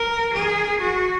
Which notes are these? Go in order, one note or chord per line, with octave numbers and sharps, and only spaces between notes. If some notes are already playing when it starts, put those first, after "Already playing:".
Already playing: A#4
G#4
F#4